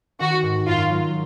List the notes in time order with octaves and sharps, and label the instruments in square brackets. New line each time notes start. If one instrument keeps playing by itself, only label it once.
[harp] D#3 [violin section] F#4
[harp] G#2
[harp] F#2 [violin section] F4
[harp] F#3